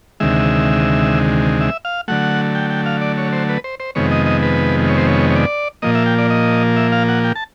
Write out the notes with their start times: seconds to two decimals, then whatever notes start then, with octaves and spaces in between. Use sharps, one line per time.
0.20 D2 C3 D#3 G#3 E5
1.61 E5
1.85 F5
2.08 D3 F#3 A3 F#5
2.55 G5
2.70 G5
2.86 F5
3.01 D5
3.18 C#5
3.33 C5
3.49 B4
3.64 C5
3.80 C5
3.95 F2 C3 D#3 G#3 B3 C#5
4.11 D#5
4.26 D#5
4.43 B4
4.89 C#5
4.98 C5
5.07 C#5
5.30 C#5
5.35 D5
5.82 A#2 F3 A#3 D#5
5.95 E5
6.06 G5
6.19 D5
6.30 D#5
6.77 E5
6.92 F5
7.08 F#5
7.24 G5
7.36 A5